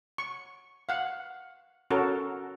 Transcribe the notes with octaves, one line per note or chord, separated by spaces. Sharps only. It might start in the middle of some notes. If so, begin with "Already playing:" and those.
C#6
F5 F#5
C#4 F#4 A4 A#4